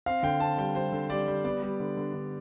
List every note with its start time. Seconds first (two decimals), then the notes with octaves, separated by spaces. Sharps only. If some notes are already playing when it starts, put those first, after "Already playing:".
0.06 C4 F5
0.23 D3 G5
0.40 C4 A5
0.58 G3 G5
0.75 G3 C5
0.92 D3
1.10 G3 D5
1.28 G3
1.44 B3 D5
1.62 G3
1.80 D3
1.97 D3
2.13 D3